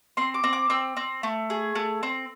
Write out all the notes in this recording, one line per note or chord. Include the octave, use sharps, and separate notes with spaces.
C4 C6
D6
C4
D6
C4 E6
C4
A3
G#4
A3
C4